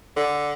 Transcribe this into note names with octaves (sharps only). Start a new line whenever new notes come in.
D3